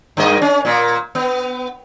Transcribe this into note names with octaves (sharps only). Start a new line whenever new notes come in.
G2 A#3 D#5
C#4
A#2 A#3
B3